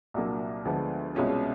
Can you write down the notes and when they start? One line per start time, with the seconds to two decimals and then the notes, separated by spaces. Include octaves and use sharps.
0.14 C2 A#2 F#3 A#3 D4
0.65 D2 D3 F3 G#3 B3
1.15 C2 B2 G#3 C#4 F4